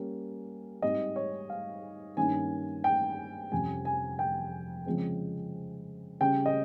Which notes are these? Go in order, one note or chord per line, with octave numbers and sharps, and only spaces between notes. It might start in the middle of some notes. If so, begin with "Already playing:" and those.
Already playing: G3 A#3 C#4
G#2 G3 C4 D#5
C#5
F5
G2 D#3 A#3 C#4 G#5
G5
F2 C3 G3 C#4 G#5
G#5
G5
C#3 F3 G#3 C4
C#3 G3 C#4 G5
D#5